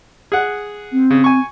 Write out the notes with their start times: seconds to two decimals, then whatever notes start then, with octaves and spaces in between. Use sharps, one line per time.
0.32 G#4 F#5
0.92 C4
1.11 C#3
1.24 G#5 C#6